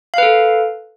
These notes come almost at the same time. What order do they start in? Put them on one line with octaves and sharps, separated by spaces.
F5 B4 A4